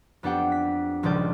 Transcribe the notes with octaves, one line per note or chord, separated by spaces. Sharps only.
F2 B3 D4 G4 F#5 G5
B6
D#1 C#2 F3 D5 G6